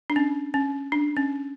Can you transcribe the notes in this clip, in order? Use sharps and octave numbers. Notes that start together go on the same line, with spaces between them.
D4
C#4
C#4
D4
C#4